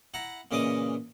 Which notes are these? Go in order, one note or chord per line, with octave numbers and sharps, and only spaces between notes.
E4 F#5 A#5
A#2 C#3 E3 D#5 D6 D#6